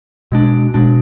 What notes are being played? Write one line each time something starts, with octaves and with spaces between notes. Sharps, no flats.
B2 G#3 D4
B2 G#3 D4